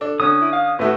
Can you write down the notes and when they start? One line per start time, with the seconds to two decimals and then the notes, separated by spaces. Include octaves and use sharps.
0.01 D4 A4
0.20 D3 C#4 D#6
0.41 E4
0.52 F5
0.79 A2 A3 F#4 B4